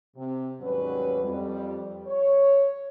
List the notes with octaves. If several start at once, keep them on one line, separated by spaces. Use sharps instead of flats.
C3
D#2 G#2 F#3 G3 C#4 B4
F2 G3
C#5